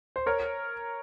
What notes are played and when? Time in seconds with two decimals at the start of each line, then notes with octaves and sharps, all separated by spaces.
0.16 C5
0.26 A#4 C#5